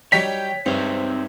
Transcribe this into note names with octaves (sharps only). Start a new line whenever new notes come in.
F#3 G3 D#4 C#5 G5 B6
G2 C4 D#4 C#5 E5